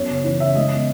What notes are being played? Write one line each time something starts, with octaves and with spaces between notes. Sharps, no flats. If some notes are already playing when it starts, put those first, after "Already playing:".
Already playing: F#2 B3 C#5
C#3
E3 C#5
C#3 E5
G#3 D#5
B3